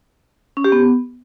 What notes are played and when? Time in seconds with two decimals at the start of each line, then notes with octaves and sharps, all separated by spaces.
0.57 C#4
0.64 G4
0.72 B3